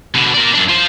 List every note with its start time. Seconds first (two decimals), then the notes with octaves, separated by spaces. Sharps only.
0.15 B2 D3
0.34 A#4 D5
0.55 F#2 D4
0.69 F4 C5